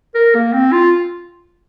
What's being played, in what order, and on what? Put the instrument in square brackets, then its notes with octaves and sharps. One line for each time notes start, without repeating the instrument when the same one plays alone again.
[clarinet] A#4
A#3
C4
F4